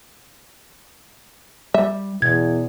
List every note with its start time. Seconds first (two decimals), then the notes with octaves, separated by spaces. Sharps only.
1.74 G3 E5
2.22 E2 B2 G#6